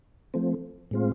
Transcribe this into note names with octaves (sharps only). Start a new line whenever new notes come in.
F3 A3 C4
A2 G#3 C4 F4